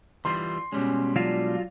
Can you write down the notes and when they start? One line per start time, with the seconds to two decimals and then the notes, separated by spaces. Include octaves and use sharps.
0.25 E3 G3 F4 C6
0.72 B2 G3 G#3 C#4
1.16 F#3 D4 F4